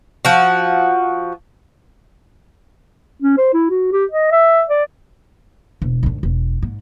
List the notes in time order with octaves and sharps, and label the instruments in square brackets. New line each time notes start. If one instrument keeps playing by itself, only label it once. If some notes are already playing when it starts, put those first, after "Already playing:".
[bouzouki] F3 F#4
[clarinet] C#4
C5
E4
F#4
G4
D#5
E5
D5
[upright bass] E1
D2 G#2
E1
G#2